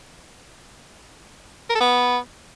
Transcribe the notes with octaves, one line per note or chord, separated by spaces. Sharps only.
A#4
A4
B3